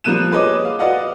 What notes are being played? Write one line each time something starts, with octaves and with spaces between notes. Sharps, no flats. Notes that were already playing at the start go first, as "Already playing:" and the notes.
F3 G3 A#3 F#6 D#7 E7
G#4 B4 C#5 D#5 D6
F5
F#4 B4 D5 D#5 F5 F#5